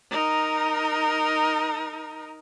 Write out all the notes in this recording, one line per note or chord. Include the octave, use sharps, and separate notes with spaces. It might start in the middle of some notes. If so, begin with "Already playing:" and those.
D#4 A#4